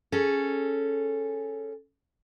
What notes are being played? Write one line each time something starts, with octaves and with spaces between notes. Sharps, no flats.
C#4 G#4 A4